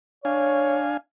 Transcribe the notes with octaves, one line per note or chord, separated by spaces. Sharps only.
D4 C#5 F5 G#5